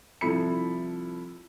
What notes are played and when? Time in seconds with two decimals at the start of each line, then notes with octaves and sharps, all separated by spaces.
0.21 C2 F3 E4 A4 B5 C#7